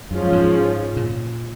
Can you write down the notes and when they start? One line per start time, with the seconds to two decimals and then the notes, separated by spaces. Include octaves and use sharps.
0.11 F#2 F3 G#3 C#4 F4
0.33 G#2
0.97 A#2